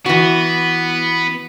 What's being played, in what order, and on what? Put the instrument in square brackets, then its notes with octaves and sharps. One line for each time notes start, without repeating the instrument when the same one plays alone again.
[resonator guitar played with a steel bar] E3 F#4 [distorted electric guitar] B3